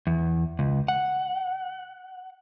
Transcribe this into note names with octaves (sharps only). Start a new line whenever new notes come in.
E2
C#2
F#5